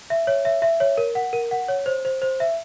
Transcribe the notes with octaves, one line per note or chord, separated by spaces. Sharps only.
E5
C#5
E5
E5
C#5
A#4
F#5
A#4
F#5
C#5
C5
C5
C5
E5